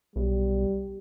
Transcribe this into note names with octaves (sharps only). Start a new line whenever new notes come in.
B1 G3